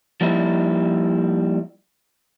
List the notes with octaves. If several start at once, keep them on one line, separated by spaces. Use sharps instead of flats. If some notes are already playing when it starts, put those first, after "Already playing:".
F3 G3 A#3 D#4 E4